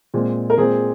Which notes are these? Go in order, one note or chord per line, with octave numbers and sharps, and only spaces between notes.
A#2 G#3 C4
A#4
A#2 G#3 C4 G#4